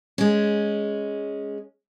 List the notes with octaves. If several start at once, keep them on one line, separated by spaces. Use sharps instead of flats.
G#3 C#4